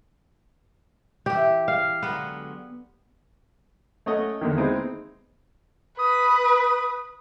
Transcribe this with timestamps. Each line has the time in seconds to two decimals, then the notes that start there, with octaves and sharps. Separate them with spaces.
1.26 E3 G4 E5
1.68 F5
2.03 D3 F#3 G#3 B3
4.06 A3 C#4 C#5 D#5 F#5
4.41 E2 D3 D#3
4.56 G#3 B3 C4 D#4 E4
5.99 B4 D#6